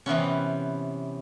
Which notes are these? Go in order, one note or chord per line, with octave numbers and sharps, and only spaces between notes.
C3 E3 B3 C#4